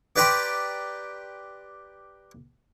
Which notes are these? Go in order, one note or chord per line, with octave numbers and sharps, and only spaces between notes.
G4 B4 D5 G5 A#5 C6